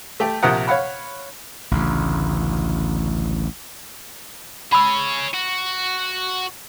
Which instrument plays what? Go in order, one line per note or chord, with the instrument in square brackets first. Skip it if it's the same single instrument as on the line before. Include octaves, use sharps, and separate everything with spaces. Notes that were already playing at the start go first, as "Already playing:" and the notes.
[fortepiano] A3 G4 G5
A#1 C3 F3 A#4 F#5 D#6
C#5 F5 F#5 B5
[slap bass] A1 D2 C#3
[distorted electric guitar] G#4 C#5 [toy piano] B5 E6
[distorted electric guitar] F#4